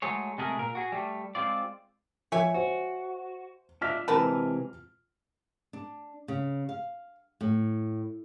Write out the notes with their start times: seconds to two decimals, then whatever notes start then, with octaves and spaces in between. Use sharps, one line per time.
0.02 F#3 G#3 A3 G#4 C#5
0.38 C3 G#3 A3 G#4 A#4
0.59 A#2 A#4
0.75 F#4 G#4
0.92 G3 A3
1.35 G#3 C4 F4 D5
2.32 F3 C#5 E5 G#5
2.54 F#4 C5
3.81 D4 F4 D#5 E5 F6 B6
4.08 C3 E3 G#3 A#4 B4 A5
5.73 D4
6.28 C#3
6.69 F5
7.41 A2